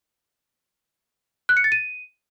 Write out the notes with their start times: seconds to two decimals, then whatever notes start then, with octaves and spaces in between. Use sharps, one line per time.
1.49 F#6
1.57 C#7
1.64 A6
1.72 D#7